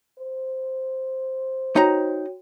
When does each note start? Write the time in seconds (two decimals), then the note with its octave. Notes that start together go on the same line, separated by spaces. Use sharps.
0.18 C5
1.76 D#4 F#4 C#5 G5 A#5